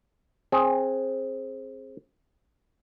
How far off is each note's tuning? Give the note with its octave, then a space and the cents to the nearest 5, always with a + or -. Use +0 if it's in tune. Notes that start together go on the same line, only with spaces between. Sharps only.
C4 +20 G#4 +5